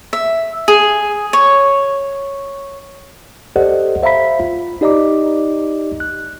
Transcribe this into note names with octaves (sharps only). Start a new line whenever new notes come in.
E5
G#4
C#5
G4 A4 C5 D5 D#5 F#5
C5 E5 F5 A#5 B5 B6
F4
D#4 G4 D5 D#5 A#5 D6
F#6